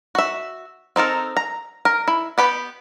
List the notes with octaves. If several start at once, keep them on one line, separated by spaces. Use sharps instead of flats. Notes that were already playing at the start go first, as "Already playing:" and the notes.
F#4 E5
C4 D#4 A4 A#4
A#5
A#4
E4
B3 G4 B4